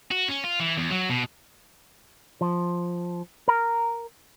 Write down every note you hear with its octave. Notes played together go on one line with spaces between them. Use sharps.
F#4
C#4
F4
E3
E2
F#3
B2
F3
A#4